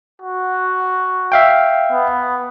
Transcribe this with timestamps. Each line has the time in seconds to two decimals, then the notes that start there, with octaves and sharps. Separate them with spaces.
0.22 F#4
1.32 E5 F5 G5
1.92 B3